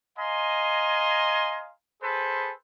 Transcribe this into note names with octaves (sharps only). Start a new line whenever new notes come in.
D#5 F5 G#5 A#5 C6
G#4 A4 B4 C5